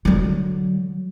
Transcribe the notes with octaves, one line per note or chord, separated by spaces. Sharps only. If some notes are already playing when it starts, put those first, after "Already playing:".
D3 F#3